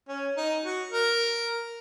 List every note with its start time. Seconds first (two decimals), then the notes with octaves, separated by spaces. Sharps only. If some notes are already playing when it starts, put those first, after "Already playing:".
0.09 C#4
0.37 D#4
0.64 F#4
0.91 A#4